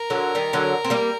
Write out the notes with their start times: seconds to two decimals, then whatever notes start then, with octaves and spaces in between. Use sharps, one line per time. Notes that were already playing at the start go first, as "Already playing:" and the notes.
Already playing: A#4
0.10 D3 F#3
0.35 D#3 G3
0.53 D3 F#3
0.84 C4
0.90 G3 A#3